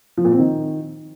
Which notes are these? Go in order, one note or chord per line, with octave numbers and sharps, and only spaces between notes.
F3
A#2
C4
D#3